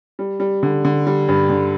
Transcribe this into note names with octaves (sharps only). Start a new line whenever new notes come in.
G3
G3
D3
D3
G3
G2
D3